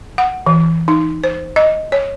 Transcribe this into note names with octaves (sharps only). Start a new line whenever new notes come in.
F#5
E3
D#4
C5
D#5
C#5